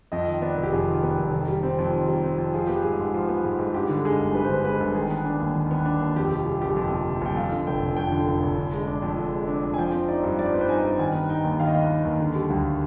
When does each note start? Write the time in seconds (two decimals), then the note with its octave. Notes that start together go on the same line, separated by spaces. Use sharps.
0.12 F2 D#5
0.28 D#3
0.42 B3 D5
0.57 F1
0.63 G4
0.72 F2 G#4
0.88 D#3
1.03 B3
1.18 F1
1.32 D#3
1.48 G3
1.63 C4
1.79 F2
1.93 D#3
2.08 G3
2.24 C4
2.38 F2
2.54 F3 G#4
2.67 B3 G4
2.81 G#2 G#4
2.99 G#2
3.14 F3
3.29 B3
3.44 G#2
3.59 G#2
3.74 G2 G4
3.89 D3
4.05 G#3 G#4
4.19 G1
4.35 G2 B4
4.44 C5
4.49 D3 B4
4.65 G#3 B4
4.80 G1
4.94 D#3 G#4
5.10 B3
5.25 D4
5.40 D#2
5.56 D#3
5.71 B3
5.86 D4
6.01 D#2
6.16 F2 G4
6.31 C3 G4
6.46 G3 G#4
6.61 G1 G4
6.76 F2
6.91 C3
7.06 G3
7.21 G1 G5
7.36 F2 F5
7.52 D3
7.67 F1 G5
7.82 F1
7.96 F2 G5
8.12 D3
8.27 F1
8.43 F1
8.58 D3
8.73 G#3
8.87 D4
9.02 F2
9.18 D3
9.33 G#3
9.48 D4
9.63 F2
9.74 G#5
9.78 F3 G5
9.94 C4
10.08 D#4 D5
10.23 G2
10.38 F3 D5
10.46 C5
10.54 C4 B4
10.61 C5
10.69 D#4 G#5
10.84 G2
10.99 D#3 G#5
11.14 B3
11.29 D#4 G5
11.44 D#2
11.59 D#3 F5
11.67 D#5
11.74 B3 F5
11.90 D#4
12.05 D#2
12.20 D3
12.36 G3
12.50 D2